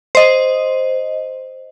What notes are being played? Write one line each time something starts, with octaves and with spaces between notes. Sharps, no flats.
C5 D#5